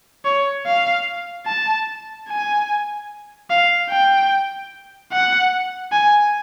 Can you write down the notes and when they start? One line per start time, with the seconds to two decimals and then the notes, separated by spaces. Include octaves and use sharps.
0.25 C#5
0.66 F5
1.46 A5
2.29 G#5
3.50 F5
3.90 G5
5.12 F#5
5.92 G#5